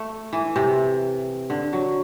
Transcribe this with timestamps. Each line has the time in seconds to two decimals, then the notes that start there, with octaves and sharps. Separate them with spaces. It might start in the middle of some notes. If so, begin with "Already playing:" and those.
Already playing: A3
0.33 E3
0.56 C3
1.50 D3
1.73 F#3